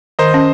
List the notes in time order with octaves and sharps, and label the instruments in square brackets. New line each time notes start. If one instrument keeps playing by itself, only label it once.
[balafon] D#3 [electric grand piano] C5 D#5
[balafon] C#4